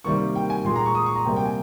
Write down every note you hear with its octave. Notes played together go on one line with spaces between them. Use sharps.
C3 D#3 G3 A#3 C#6
G5
G#5
A#2 G#3 C6
A#5
C#6
D#6
C#6
A#5
C3 G3 A#3 G5
G5
G#5